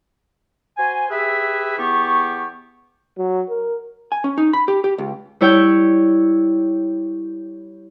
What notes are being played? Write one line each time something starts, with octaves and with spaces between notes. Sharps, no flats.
F#4 C5 G#5
G4 G#4 B4 E5
E2 B3 G4 C#6
F#3
A#4
G#5
C#4
D#4
B5
G4
G4
C#2
G3 E4 C#5 G5 E6 G6